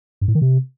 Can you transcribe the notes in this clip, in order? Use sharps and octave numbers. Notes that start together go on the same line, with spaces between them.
G2
A2
D#3
C3